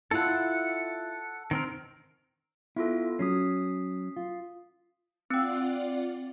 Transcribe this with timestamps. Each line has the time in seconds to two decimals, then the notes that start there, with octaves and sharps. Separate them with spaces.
0.11 E4 F4 A4 F#5
1.51 D#3 C4 A#4
2.76 B3 E4 F4 A4
3.19 F#3 C#4 D#6 B6 C7
4.16 F4
5.30 C4 F4 D5 F#5 G5 E6